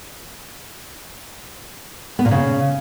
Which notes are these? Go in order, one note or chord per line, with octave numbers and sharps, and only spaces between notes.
B3
A#2
C#3